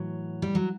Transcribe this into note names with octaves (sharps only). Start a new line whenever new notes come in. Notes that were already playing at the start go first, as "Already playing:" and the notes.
Already playing: A2 E3 F#3
G3
F#3